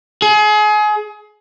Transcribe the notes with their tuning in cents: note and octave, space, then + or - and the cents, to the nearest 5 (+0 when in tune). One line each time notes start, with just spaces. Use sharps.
G#4 +30